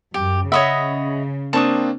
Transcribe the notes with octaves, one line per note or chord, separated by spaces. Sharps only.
F#2 G4
C#3 C#5 D#5 E5 F#5 B5 D#6
A#3 C4 D4 A5 C#6 D#6